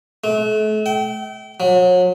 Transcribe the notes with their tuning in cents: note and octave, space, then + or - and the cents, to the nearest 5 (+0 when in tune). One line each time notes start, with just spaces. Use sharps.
A3 -40
G5 -35
F#3 -35